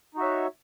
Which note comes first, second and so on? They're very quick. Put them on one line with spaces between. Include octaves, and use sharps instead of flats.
D#4 F#4 E5 C#5